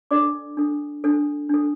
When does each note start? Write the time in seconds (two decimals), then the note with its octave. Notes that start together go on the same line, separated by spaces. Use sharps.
0.11 D4 A4 D5 D6
0.57 D4 A4
1.04 D4 A4
1.49 D4 A4